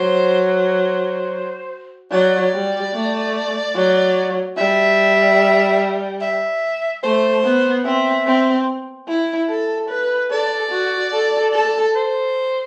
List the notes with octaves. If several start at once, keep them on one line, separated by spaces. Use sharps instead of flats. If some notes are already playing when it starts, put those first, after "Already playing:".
Already playing: F#3 C5
C5
F#3 D5
G3
A3
F#3
G3 E5
E5
A3 C5
B3
C4 E5
C4
E4
A4
B4
A4 D5
F#4
A4
A4
C5